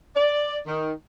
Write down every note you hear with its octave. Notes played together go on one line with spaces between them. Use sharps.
D5
D#3